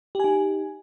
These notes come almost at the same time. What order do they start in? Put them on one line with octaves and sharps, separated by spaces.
G4 G#5 D#4